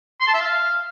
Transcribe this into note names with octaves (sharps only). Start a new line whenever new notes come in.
C6
A5
E5
F5